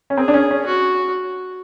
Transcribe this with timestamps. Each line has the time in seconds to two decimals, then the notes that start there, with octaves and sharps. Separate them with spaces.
0.10 C#4
0.17 C4 G#4
0.28 D4
0.34 C#4
0.51 C#4
0.66 F#4